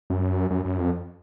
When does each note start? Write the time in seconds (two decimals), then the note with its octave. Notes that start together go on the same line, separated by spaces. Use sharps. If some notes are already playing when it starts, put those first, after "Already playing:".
0.10 F#2
0.51 F#2
0.65 F#2
0.78 F2